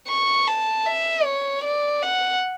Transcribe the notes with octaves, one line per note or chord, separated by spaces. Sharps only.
C#6
A5
E5
C#5
D5
F#5